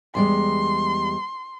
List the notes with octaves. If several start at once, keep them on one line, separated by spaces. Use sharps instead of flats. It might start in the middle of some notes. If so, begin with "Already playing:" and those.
E2 G3 G#3 C6